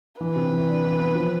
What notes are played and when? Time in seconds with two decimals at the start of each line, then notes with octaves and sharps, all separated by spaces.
0.20 E3 B4
0.36 C3
0.53 E3
0.68 D4
0.84 E3
1.00 B3
1.15 F3